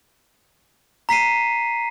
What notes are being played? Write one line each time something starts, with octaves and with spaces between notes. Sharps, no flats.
A#5 B6 C7 D#7